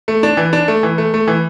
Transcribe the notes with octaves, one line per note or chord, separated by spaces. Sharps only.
A3
D4
E3
D4
A3
E3
A3
A3
E3